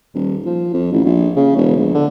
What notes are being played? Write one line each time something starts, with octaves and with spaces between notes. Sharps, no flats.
D#1
F3
F2
A1
A#1
C#3
E1
A#1
D3